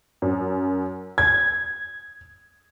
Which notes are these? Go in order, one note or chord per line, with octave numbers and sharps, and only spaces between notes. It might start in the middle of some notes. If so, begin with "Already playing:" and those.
F#2
G#6